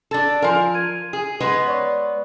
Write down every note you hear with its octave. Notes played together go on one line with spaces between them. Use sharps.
D4 A4 A5 A6
F3 A#4 F5 G#5 C6
G#6 D#7
G#4
G#3 B3 B4
C#5 D5 C#6